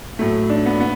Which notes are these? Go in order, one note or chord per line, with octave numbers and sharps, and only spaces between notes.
A2 F#3 A3
D4
B3
B3